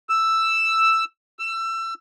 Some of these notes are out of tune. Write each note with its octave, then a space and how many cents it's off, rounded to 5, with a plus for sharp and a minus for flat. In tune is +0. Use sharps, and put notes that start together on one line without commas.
E6 +5
E6 +25